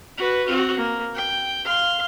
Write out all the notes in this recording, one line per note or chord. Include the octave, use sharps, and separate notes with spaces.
F#4 B4
C4 F#4
A#3
G5
F5 C6